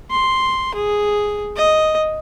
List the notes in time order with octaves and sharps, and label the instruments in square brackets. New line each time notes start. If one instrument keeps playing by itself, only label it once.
[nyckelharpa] C6
G#4
D#5